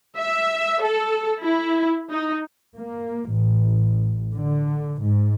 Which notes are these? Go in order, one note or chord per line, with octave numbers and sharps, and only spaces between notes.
E5
A4
E4
D#4
A#3
A1
D3
G#2